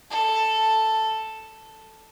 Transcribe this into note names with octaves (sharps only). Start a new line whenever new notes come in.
A4